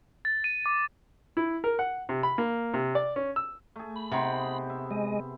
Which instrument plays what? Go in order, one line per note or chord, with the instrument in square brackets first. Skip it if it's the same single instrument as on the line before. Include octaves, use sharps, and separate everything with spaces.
[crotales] A6
D#7
D6
[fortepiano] E4
A#4
F#5
C3
B5
A#3
C3
D5
C#4
E6
[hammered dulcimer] A3 G#4
[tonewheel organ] B5
[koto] C3 [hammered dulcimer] B3 D#4 C5
[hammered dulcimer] E5
[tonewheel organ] G#3 D#5